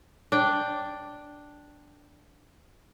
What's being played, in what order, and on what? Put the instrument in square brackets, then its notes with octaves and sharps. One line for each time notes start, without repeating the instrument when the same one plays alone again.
[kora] D4 G5